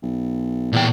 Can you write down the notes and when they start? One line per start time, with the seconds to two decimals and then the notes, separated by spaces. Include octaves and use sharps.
0.02 B1
0.73 E2 A#2 G5